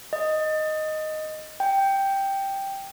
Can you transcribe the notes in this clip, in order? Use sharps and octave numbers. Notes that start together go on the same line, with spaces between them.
D#5
G5